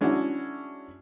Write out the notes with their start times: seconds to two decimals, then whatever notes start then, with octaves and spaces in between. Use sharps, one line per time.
0.01 G#3 C#4 D4 E4 F#4